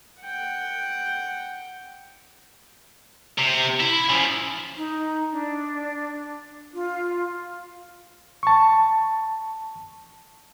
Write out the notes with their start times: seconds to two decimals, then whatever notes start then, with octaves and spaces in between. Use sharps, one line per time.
0.22 F#5 G5
3.38 C3
3.80 E4
4.10 C#3 F3
4.77 D#4
5.32 D4
6.74 F4
8.43 A5 C#6